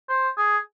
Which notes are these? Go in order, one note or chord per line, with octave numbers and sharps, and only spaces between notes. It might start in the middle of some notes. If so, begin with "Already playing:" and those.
C5
G#4